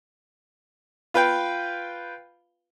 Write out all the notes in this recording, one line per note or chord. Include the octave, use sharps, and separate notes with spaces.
F4 B4 F5 G5